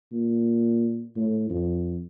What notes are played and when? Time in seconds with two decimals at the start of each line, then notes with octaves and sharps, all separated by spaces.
0.12 A#2
1.16 A2
1.50 F2